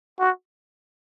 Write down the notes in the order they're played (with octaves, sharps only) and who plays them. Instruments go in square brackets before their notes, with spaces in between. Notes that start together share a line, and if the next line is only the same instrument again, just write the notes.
[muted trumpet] F#4